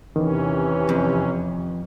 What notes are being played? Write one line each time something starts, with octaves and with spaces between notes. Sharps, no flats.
E2 C3 D#3 E3 C#4
F2